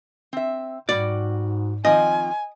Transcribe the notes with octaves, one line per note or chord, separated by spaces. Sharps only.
C4 E5
G#2 G3 F#4 D5
D#3 F3 C4 D#5 G#5